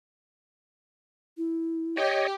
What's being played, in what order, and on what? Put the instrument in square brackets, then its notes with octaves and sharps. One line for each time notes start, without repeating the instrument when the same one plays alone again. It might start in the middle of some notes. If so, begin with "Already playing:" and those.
[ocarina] E4
[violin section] G4 [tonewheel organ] C#5 D#5